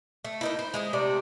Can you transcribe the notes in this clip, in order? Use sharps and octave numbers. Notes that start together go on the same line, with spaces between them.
A3
A#3 D#4 E4
C5
G#3 E4 C5
C3 A3 D5